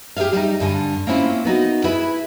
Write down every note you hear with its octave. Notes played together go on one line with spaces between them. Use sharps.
G4 G#4 B4 E5 F5
G3 D#4
G2 D3 G#5
A#3 C4 C#4 E4 F4
B3 D#4 F#4
E4 G#4 B4 E5